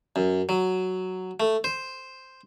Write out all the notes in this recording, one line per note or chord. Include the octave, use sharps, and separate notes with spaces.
F#2
F#3
A3
C5